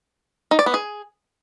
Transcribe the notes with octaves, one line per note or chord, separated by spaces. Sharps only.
D#4
D5
B3
G#4